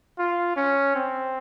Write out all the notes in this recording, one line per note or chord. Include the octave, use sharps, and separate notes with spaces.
F4
C#4
C4